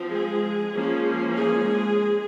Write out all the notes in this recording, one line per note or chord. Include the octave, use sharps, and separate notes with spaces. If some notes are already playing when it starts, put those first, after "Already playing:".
Already playing: F3 C4
G#3 G#4
F3 A#3 C#4
G#3 G#4